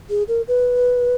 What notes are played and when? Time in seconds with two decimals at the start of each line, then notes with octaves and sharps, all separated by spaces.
0.10 G#4
0.28 A#4
0.48 B4